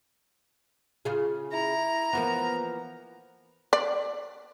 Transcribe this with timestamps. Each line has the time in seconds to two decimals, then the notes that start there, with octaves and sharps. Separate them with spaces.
1.05 C#3 F4 G#4
1.53 E4 A#5
2.13 E3 F3 A#3 B3
3.73 D5